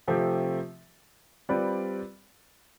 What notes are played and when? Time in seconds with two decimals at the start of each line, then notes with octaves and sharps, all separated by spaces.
0.07 C3 F3 A3 C4 G4
1.49 G3 C4 F4 B4 D5